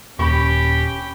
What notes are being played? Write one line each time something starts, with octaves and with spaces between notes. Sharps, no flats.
D#1 C#4 G4 G5 B5 C#6